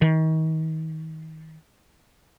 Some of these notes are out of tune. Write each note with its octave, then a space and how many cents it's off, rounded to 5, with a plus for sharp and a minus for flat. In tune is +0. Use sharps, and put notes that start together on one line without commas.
D#3 +35